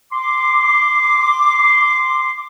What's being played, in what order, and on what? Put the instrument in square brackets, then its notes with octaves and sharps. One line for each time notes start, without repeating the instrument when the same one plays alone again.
[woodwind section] C6 D6